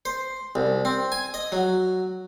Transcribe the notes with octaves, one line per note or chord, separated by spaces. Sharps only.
C5
C2
C4
G#5
D#5
F#3